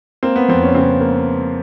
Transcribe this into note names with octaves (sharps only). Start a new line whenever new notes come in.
A#3 C4
B3
F2 C4
C#4
C#3 C4
A#3